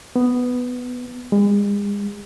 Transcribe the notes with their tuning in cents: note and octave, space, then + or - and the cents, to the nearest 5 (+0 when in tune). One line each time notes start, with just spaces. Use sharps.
B3 +5
G#3 -40